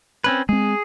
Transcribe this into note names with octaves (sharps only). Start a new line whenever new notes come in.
C4 C#4 B4
G#3 C4 G#4